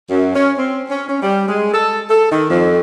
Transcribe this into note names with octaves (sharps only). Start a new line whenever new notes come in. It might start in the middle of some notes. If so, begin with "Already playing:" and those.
F#2
C#4
C4
C#4
C#4
G3
G#3
A4
A4
D#3
F2